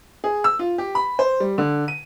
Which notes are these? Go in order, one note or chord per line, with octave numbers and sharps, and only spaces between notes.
G#4
E6
F4
G4
B5
C5
G3
D3
D#7